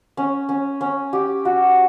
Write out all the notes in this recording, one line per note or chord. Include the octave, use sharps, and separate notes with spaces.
C#4
C#4
C#4
G4
F#4